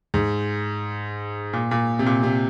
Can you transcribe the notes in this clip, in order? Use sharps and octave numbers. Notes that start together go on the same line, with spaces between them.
G#2
A#2
A#2
C3
A#2
C3